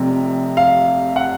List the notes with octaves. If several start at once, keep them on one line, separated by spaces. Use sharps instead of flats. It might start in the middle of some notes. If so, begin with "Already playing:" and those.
Already playing: F1 F2 C3
F5
F#5